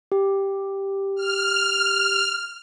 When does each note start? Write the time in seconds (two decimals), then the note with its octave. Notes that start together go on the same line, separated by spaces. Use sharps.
0.12 G4
1.15 F6